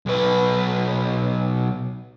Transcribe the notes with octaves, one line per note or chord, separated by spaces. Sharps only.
B1 B4